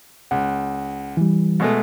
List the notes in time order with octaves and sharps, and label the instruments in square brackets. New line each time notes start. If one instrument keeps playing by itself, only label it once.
[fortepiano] C#2 [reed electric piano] F#5
[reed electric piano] E3 G3
[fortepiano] B2 G#3 A3